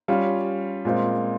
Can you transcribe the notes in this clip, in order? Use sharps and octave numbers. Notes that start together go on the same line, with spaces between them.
G3 C#4 F4
A#2 G#3 C4 F4